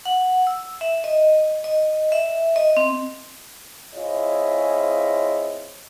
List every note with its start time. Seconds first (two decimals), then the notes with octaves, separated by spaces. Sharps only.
0.05 F#5
0.47 E6
0.81 E5
1.04 D#5
1.64 D#5
2.12 E5
2.56 D#5
2.77 C4
3.94 C4 E4 F4 G#4 C#5 D#5